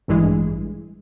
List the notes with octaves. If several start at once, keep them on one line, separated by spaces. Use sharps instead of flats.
A1 G2 E3 G#3